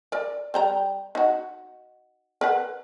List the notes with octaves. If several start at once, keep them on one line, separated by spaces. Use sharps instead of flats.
A#4 D5
G3 G5 A#5
D#4 F#4
A#4 B4 F#5